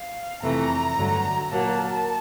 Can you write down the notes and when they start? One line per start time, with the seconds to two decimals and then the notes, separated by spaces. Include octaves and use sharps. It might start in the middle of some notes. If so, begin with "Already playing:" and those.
Already playing: F5
0.42 F2 C3 E3 A3 A#5
0.96 G2 D3 F#3 A3
1.50 A#2 F#3 A#3 A5